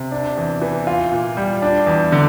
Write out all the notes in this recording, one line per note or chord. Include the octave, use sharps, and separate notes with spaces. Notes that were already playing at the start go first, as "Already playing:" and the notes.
Already playing: C3
D4
E2
E3
F4
A#2
G3
D4
E2
D3